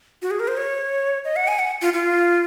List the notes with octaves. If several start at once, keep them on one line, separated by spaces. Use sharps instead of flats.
F#4
G#4
A#4
C5
C#5
D#5
F#5
G#5
F#5
F4
F4